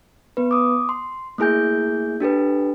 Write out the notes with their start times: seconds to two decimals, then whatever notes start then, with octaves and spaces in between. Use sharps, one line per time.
0.37 B3 B4
0.51 D6 D#6
0.89 C6
1.38 A3 A#3 E4 G#4 G#5 G6
2.20 D4 G4 A4 B4